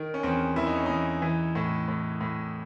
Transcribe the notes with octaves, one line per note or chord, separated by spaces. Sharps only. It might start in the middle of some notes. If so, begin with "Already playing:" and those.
Already playing: D#3
C#4
E2 C4
E2 E4
D#4
C#4
E2 D#4
E3
A2
A2
A2